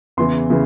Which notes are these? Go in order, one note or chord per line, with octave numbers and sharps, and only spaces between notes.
E2 C#3 E3 C6
C#3 E3